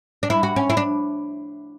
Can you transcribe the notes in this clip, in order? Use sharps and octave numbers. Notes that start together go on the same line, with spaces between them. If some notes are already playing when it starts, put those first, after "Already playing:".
D4
E4
F#4
C#4
E4
D4